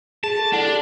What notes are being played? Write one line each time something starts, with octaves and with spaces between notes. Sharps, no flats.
G#4 A5
A4
D4 E4 F#5
G4